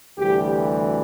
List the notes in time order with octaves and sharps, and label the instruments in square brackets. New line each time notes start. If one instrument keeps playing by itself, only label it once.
[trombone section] D2 C3 E3 G3 G4